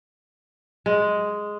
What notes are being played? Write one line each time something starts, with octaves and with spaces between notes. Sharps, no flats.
G#3